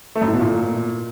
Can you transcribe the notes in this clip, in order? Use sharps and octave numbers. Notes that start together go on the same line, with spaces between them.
A3
F#2
A2
B2
A#2